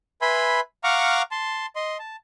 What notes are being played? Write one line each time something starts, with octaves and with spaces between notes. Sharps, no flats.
B4 E5 G#5 B5 C6
F5 F#5 A#5 C#6 D6 F6
A5 C6
D#5 C6
A5